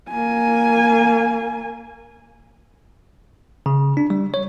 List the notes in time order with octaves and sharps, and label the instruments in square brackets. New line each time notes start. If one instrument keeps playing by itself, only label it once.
[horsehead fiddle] A#3 G#5
[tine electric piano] C#3
D4
G3
C#5